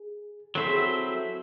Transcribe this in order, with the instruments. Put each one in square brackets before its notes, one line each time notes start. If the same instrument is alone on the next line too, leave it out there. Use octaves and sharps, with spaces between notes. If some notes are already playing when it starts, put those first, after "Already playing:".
Already playing: [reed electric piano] G#4
[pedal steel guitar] F#3 C4 E4 C5 E5 [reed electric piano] A4
[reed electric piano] G#4
F#4 A4